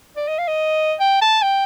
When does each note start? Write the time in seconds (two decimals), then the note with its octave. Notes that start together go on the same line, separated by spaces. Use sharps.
0.16 D5
0.28 D#5
0.38 F5
0.48 D#5
1.00 G5
1.22 A5
1.42 G5